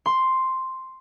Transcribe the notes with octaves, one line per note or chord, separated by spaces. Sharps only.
C6